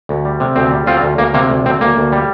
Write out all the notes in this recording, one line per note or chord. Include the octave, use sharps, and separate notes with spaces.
D2
G3
C3
D2 C4
G3
D2 C4 F4
D2
D2 A#3
C3 A#3
D2
D2 C4
D2 A#3
D2
G3